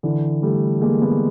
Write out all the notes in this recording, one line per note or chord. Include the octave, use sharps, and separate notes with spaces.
D3 E3
G3 A3
G#3 A#3
A3 B3